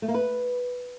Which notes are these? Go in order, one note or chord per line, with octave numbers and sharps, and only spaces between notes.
A3
A#3
B4